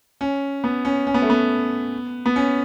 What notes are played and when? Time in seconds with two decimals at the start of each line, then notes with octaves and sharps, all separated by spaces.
0.21 C#4
0.64 B3
0.85 C#4
1.07 C#4
1.14 B3
1.22 A3
1.30 B3
2.26 B3
2.36 C#4